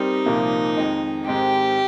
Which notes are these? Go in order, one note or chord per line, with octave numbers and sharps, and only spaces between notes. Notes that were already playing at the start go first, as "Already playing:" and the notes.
Already playing: G3 C4 D#4 G4 A#4
C2 A#2 F3 A#3
F2 D#3 G#3
G#2 D#3 G#3 C4 G4